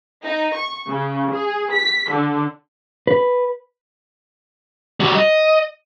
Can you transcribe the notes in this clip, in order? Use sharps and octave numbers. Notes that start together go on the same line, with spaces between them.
D#4
C#6
C#3
G#4
B6
D3
B4
G3 F#4
D#5